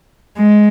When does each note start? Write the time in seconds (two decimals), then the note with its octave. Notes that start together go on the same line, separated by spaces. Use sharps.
0.37 G#3